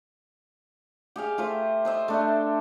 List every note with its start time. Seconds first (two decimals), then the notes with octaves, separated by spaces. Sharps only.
1.16 G4 G#4 F5
1.38 A3 F4 C5 E5
1.85 C5 D#5 E5 C6
2.08 A3 D4